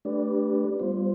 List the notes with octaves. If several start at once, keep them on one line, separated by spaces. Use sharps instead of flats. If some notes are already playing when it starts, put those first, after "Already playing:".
A3 D4 G4 B4 D5
G3 B3 F4 C5